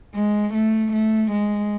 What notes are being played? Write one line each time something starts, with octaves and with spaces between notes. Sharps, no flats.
G#3
A3
A3
G#3